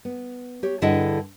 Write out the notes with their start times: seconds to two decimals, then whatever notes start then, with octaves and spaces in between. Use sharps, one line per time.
0.05 B3
0.63 G4 C#5
0.82 G2 D3 E4 G#4 D#5 F#5